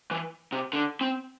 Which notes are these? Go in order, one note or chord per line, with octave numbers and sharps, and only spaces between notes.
E3
C3
D3
C4